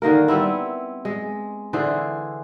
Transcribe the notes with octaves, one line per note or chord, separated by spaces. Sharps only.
D3 D#3 A#3 A#4
G3 B3 C4 E4
G#3
D3 E3 G#4 C5